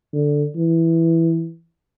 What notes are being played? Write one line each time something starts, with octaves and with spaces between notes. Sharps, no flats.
D3
E3